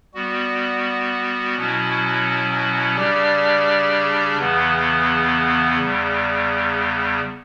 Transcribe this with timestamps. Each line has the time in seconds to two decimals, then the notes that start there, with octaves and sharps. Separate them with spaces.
0.14 G3 B3 F#4
1.56 B2 F#3 C#4 E4
2.96 C#3 G3 D4 G4 D5
4.38 E2 C#3 E3 B3
5.79 E2 C#3 G3